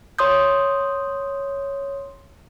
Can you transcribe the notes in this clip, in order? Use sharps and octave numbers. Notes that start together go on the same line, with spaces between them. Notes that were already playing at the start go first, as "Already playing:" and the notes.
C#5 C6 D#6 G6